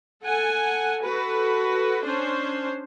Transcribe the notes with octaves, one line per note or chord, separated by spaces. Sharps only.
A4 F#5 G#5
F#4 A4 B4
C#4 D4 C5